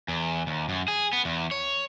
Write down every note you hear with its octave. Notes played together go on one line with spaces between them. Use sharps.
E2
D#2
F#2
G#4
B3
E2
C#5